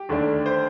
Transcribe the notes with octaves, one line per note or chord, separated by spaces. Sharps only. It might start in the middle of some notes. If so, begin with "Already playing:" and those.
Already playing: G4
D#2 D3 A3 D4
C5